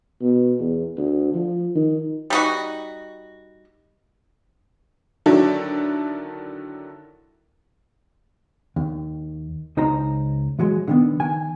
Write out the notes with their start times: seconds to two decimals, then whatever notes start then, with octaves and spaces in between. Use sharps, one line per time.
0.21 B2
0.60 E2
0.97 D2
1.34 F3
1.75 D#3
2.30 G3 D#4 F#4
5.26 D3 D#3 F#3 D4 E4 A4
8.76 D#2
9.77 C#2 D#4 C5 A#5
10.59 E3 F#3 G#3
10.88 D3 D#3 B3
11.20 D#3 G#5